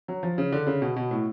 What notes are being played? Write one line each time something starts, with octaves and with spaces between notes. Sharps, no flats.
F#3
F3
C#3
D3
C#3
B2
B2
A2